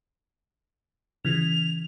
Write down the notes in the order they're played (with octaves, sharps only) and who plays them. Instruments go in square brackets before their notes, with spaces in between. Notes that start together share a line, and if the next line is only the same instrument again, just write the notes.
[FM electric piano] C#3 E3 [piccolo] F7